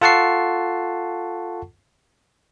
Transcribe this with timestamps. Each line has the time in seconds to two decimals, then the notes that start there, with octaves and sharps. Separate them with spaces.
0.01 F4 A4 F#5 A5 C#6 C7